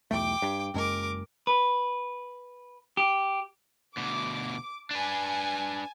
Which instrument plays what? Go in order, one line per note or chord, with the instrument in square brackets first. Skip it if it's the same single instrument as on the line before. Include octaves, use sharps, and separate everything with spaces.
[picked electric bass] B1 E2 A3 [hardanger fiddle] G5 D6
[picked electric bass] G2
[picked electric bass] F#1 F#2 G#3 [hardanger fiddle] A#4 D6
[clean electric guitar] B4
G4
[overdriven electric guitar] D2 B2 [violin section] D6
[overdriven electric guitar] D4 B4 [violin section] G#5 A5